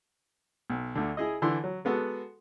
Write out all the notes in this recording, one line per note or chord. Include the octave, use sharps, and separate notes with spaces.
B1
D2 D3
E4 G#4 D#5
D3 E3 C6
F#3
G#3 B3 F#4 A4